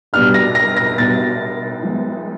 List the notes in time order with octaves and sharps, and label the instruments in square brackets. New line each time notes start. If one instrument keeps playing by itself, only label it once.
[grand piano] B2 G3 B3 D4 G4 [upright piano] F6
[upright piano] A#6
A#6
A#6
[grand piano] B2 G3 B3 D4 G4 [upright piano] A6
[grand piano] F3 G#3 B3